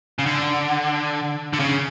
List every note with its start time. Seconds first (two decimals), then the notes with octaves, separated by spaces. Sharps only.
0.19 C#3
0.26 D3
1.53 D3
1.60 C#3